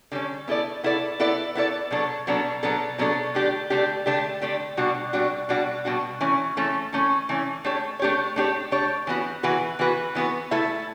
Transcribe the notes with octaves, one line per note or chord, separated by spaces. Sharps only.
D3 G3 C#4
B3 E4 A4 D5
B3 E4 A4 D5
B3 E4 A4 D5
B3 E4 A4 D5
B2 F#3 B3 D4 A4
B2 F#3 B3 D4 A4
B2 F#3 B3 D4 A4
B2 F#3 B3 D4 A4
D3 A3 D4 G4
D3 A3 D4 G4
D3 A3 D4 G4
D3 A3 D4 G4
B2 G3 D4 F#4
B2 G3 D4 F#4
B2 G3 D4 F#4
B2 G3 D4 F#4
E3 A3 C#4
E3 A3 C#4
E3 A3 C#4
E3 A3 C#4
A3 D4 G4 C#5
A3 D4 G4 C#5
A3 D4 G4 C#5
A3 D4 G4 C#5
E3 B3 F#4 B4
E3 B3 F#4 B4
E3 B3 F#4 B4
E3 B3 F#4 B4
A3 E4 A4 E5